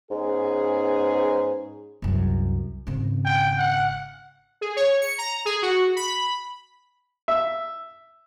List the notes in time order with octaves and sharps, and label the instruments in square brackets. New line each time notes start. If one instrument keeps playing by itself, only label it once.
[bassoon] G#2 [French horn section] B3 C#4 G#4
[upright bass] C2 F#2
G#1 C#3
[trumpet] G5
F#5
[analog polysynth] G#4
C#5
C#7
A#5
G#4
F#4
B5
[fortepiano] E5